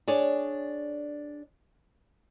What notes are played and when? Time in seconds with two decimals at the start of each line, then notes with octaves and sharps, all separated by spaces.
0.08 D4 G#4 C#5 D5